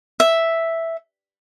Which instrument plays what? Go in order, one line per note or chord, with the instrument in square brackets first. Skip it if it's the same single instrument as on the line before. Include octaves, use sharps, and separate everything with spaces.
[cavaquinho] E5